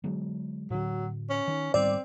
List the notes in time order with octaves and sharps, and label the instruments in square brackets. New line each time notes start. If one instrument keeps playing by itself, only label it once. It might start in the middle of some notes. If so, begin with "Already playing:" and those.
[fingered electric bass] D3 F#3 G#3
[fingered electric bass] A2 D3 [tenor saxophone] F#3
[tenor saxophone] C#4
[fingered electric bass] D#3
[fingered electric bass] G#2 D#3 G3 [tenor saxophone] C4 [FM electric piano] D5